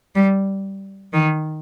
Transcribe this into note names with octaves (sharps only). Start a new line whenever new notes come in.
G3
D#3